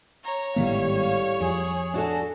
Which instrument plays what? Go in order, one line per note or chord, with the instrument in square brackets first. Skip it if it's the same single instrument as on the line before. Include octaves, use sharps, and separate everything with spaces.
[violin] C#5 [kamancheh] A#5
[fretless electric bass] G#1 D#3 B3 [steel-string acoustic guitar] A2 G3 [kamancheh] F5
[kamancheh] F5
[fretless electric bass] F2 [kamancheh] G#4
[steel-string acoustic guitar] D4 F#4 A4